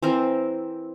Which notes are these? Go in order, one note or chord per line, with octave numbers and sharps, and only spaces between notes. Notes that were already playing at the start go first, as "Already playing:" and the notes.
E3 C4 A#4